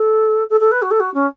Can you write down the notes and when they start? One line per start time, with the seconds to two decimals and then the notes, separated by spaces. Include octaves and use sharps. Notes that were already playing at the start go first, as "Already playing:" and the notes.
Already playing: A4
0.50 A4
0.60 A4
0.71 B4
0.82 F#4
0.91 A4
1.00 F#4
1.14 C#4